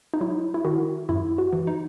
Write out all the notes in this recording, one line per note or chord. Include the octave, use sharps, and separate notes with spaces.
D#4
F#3 E4
E4
D#3 F#4
F#2 E4
F#4
E3
D#4